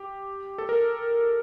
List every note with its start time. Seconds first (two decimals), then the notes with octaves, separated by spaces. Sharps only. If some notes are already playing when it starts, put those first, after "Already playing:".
Already playing: G4
0.58 A4
0.69 A#4